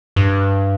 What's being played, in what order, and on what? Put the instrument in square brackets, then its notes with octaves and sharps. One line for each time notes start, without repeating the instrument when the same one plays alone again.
[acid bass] G2